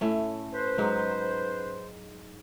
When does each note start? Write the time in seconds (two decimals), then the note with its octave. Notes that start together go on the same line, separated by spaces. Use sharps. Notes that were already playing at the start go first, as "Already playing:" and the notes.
0.01 A2 A3 C#4
0.53 B4 C5
0.78 G#2 F#3 D#4